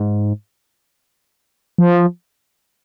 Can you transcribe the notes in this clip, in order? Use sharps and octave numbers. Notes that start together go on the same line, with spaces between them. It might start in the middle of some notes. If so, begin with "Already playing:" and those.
Already playing: G#2
F3